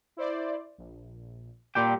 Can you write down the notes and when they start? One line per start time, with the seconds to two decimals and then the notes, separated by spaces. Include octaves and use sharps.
0.17 E4 C5 D5
0.78 A#1
1.75 A#2 G3 G4 G5